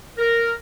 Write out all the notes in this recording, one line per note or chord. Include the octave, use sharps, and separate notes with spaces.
A#4